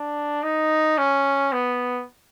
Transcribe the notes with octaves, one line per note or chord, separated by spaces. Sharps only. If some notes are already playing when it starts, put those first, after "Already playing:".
Already playing: D4
D#4
C#4
B3